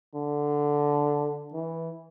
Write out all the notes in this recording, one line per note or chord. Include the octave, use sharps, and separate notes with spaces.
D3
E3